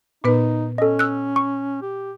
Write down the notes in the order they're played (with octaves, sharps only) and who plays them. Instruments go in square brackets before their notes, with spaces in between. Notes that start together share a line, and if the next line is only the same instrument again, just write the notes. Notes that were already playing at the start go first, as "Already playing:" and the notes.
[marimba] A#2 B3 B4 [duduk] D#4
[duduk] C#4 [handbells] A4 D#5
[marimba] E6 F#6
[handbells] C#6
[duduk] G4